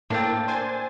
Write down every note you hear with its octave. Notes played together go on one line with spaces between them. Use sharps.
A2 A#3 C4 D4 A6
C5 G#5 A6